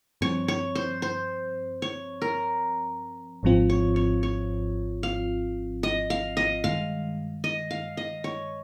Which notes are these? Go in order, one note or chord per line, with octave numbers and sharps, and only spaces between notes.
G2 F3 C4 C#5
C#5
C5
C5
C#5
A#4
G#1 G#2 F3 C4 F4
C#5
C#5
C#5
F5
D#5
F5
D#5
G2 D#3 G#3 F5
D#5
F5
D#5
C#5